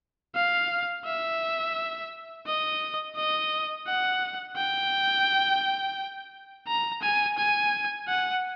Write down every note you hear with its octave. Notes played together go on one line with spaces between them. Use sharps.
F5
E5
D#5
D#5
F#5
G5
A#5
G#5
G#5
F#5